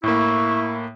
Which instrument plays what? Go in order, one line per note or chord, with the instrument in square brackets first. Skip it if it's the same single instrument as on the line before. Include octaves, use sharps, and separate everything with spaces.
[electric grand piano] A2 A#3 [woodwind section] E4 [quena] C#6